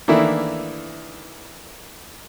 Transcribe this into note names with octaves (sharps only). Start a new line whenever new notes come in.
D#3 E3 A3 A#3 D4 E4